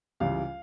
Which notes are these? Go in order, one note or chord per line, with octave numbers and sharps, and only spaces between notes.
C#2 C#3 E3 G3 F5